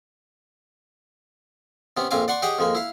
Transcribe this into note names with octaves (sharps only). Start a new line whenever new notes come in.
C3 B3 C#4
A#1 F2 C4 F5 G#5 D6
D5 F#5 C6 C#6
G4 G#4 C#5 D#5 F#5 G5
F2 G#3 A#3
E4 F5